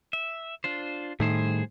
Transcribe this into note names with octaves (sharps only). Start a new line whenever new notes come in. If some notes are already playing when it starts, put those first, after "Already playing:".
E5
D4 F4 C5
A2 D#3 G3 G#4 C5